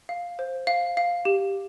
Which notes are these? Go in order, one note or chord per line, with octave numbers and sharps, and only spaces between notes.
F5
C5
F5
F5
G4